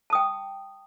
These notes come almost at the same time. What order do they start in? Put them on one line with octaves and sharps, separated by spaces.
A5 D#6 G5